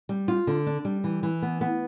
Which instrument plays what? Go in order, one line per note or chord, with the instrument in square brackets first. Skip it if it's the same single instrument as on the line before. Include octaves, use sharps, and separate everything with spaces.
[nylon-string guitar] G3
F4
D3
D4
G3
E3
E3
B3
B3